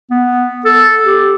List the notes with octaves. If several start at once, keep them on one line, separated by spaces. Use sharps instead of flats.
B3
A4
G4